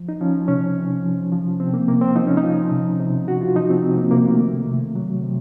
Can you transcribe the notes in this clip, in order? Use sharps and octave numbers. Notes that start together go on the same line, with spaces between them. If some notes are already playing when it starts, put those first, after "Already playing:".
Already playing: F3
D#4
F3 C#4
C3 C#4
C3
F3
F3
C3 C4
A#3
C3 A#3
C4
F3 D#4
C#4
D#4
F3
C3
C3
F3 F#4
F4
F3 D#4
C4
C3 C4
A#3
C3 A#3
A3
D#3
C3
F#3
C3